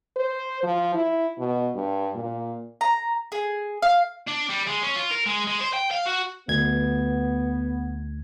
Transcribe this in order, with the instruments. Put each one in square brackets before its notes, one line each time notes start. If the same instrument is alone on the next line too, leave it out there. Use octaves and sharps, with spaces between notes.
[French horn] C5
F3
E4
B2
G2
A#2
[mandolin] A#5
G#4
F5
[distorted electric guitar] D4
G3
G#3
C#4
F4
A#4
G#3
G#3
C5
G5
F5
F#4
[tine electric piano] D2 G#6 [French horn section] B3